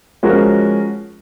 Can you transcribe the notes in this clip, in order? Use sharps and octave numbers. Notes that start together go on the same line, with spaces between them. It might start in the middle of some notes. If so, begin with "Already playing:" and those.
F3 G#3 C#4 F#4 A#4